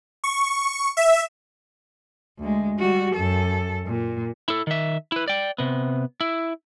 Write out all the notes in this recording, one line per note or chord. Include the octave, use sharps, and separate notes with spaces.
C#6
E5
D2 G#3
G3 F#4
F#2 A4
A#2
E4 A4
D#3 E5
E4 B4
D5 G5
C3 B3
E4